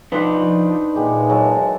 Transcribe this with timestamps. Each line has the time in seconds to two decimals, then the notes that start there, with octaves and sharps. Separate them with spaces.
0.12 F3 D4 D#4 B4 C5 F#5
0.96 D#2 A#2 E3 G#3 G4
1.29 F#3 A#4 A5